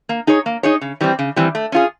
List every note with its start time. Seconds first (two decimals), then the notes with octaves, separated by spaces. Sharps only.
0.09 A#3
0.27 D#4 G#4 C#5
0.46 A#3
0.63 D#4 G#4 C#5
0.81 C#3
1.01 E3 G3 C4
1.19 C#3
1.36 E3 G3 C4
1.55 A3
1.72 C#4 F4 G#4